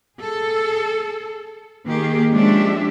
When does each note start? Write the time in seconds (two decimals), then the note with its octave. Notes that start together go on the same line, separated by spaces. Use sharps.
0.19 G#4 A4
1.87 D#3 A#3 G4 G#4
2.31 F3 G#3 C#4 D4 G4 E5